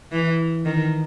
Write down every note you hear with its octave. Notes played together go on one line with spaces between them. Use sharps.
E3
D#3